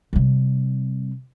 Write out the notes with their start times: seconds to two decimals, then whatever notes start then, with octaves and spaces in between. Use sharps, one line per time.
0.13 C3 G3